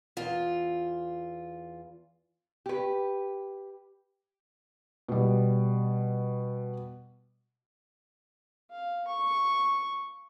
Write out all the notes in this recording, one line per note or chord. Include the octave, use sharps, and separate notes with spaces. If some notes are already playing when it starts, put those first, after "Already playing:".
E2 F4
G4 B4
B2 G3
F5
C#6